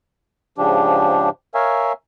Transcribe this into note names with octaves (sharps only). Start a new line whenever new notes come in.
G#2 C#3 F3 D4 G4
A#4 C#5 E5 F5 G#5